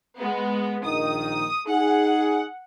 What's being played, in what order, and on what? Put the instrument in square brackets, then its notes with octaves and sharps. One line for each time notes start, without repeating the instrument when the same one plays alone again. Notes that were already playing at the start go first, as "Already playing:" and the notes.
[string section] G#3 B3
[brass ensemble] A#1 D#3 D#4 [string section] D#6
[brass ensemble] D#4 G#4 [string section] F#5